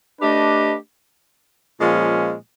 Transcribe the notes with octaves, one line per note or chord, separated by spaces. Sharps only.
A3 D4 G4 B4 D#5
A#2 F3 G#3 C#4 F4